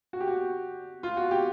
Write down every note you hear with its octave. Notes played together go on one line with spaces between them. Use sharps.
F#4
G4
F#4
F4
F#4
G4